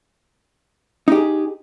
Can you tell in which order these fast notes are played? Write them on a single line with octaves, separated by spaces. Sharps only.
D#4 G4 G#4